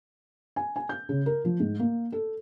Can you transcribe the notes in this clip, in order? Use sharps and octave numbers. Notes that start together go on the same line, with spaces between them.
G#5
G#5
G6
C#3
A#4
F3
G#2
A#3
A4